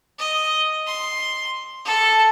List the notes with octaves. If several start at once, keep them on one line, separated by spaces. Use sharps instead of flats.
D#5
C6
A4